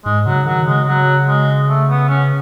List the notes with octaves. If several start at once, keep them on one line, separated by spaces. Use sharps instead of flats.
G#2 G#3
C#3 F#3
D#3 F#3
C#3 G#3
F#3
G#3
A3
B3
C#4